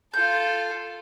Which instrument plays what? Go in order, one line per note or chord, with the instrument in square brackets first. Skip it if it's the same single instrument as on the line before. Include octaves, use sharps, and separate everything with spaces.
[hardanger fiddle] F4 A4 [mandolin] G6